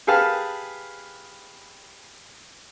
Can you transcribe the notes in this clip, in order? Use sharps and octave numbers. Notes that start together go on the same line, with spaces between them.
G4 G#4 B4 F5 A5